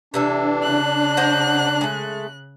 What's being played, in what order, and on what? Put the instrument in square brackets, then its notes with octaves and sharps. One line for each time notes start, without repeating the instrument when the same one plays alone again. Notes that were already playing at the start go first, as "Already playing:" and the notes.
[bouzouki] C3 E3 A4 [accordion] D4
[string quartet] C#3 F#6
[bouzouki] C5 D#5 F#5
G#3 A3